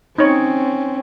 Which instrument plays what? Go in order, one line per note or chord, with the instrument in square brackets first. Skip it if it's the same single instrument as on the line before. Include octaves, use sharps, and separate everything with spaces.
[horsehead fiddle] C4 C#4 [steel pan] D#4 C#5